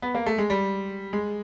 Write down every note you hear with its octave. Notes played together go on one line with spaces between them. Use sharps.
B3
A#3
A3
G#3
G3
G#3